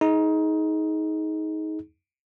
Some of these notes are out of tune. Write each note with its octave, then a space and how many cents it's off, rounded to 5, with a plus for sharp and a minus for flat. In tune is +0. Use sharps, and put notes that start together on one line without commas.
D#4 +20 G#4 +25